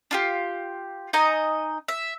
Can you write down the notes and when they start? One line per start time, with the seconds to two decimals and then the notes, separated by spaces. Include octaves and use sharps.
0.11 D4 F4 G4
1.13 D#4 D#5 G#5 A#5
1.88 E5